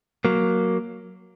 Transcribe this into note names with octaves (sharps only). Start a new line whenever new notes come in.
F#3 A#3